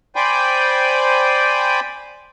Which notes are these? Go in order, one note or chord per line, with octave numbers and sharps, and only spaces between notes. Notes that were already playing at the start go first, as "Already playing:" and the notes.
C5 D5 G5 G#5 B5